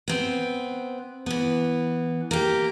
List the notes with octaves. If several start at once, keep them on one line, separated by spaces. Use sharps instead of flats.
B3 C4
E3 B3
A#3 G4